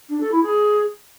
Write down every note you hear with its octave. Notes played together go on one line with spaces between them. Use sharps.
D4
A4
E4
G#4